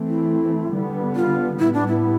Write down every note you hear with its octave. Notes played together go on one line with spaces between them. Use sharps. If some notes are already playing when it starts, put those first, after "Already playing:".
Already playing: E3 A3 C4
E4
D3 G3 B3
F4
A2 G3 B3 E4
D4
E4